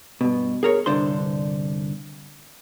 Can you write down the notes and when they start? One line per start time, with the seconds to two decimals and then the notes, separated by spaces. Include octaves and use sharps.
0.21 G2 B2
0.63 G#4 A#4 C#5
0.86 C2 G2 D3 D4 C5 C6